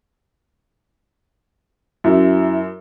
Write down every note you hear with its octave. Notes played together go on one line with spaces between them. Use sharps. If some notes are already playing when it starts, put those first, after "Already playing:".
F#2 E4